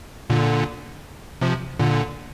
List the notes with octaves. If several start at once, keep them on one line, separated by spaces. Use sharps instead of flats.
A#2 D3
C3 F3
A#2 D3